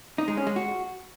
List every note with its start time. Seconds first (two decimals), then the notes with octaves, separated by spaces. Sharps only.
0.18 D#4
0.28 G#3
0.37 C#4
0.47 G#3
0.56 F#4